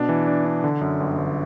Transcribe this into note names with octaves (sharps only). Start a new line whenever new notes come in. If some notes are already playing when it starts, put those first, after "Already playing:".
Already playing: B2 D4
E3
D4
D4
D3
F#2
G1
G1